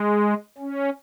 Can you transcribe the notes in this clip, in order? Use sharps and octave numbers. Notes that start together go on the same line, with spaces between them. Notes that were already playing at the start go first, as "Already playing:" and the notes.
Already playing: G#3
C#4